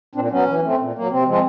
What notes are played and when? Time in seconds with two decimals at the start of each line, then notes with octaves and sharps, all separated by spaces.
0.15 A#2 C4 D4
0.31 F#3 B3 C#4
0.48 E3
0.63 A3 C4
0.79 A#2
0.95 F#3 A#3
1.11 C3 C4
1.27 F3 G#3 C4